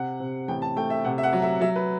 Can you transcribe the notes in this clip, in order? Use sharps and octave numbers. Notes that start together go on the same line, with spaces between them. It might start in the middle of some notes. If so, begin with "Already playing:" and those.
Already playing: C3 F#5
C3
A1 G5
A5
A3 G5
E5
C3 F#5
E5
F#5
F#3
E5
F#3 E5
B4